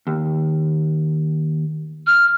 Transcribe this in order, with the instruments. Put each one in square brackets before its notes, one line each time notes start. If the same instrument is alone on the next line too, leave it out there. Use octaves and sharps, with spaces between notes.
[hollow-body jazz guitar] D#2
[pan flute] F6